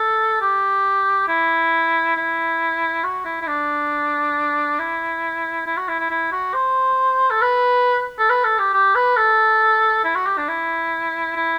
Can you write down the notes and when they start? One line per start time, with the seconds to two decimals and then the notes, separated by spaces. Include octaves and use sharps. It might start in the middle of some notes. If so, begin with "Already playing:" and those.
Already playing: A4
0.41 G4
1.28 E4
2.16 E4
3.04 F#4
3.25 E4
3.42 E4
3.47 D4
4.79 E4
5.66 E4
5.77 F#4
5.88 E4
5.99 E4
6.11 E4
6.32 F#4
6.54 C5
7.31 A4
7.42 B4
8.19 A4
8.29 B4
8.44 A4
8.59 G4
8.73 G4
8.95 B4
9.17 A4
10.05 E4
10.15 F#4
10.27 G4
10.38 D4
10.48 E4
11.36 E4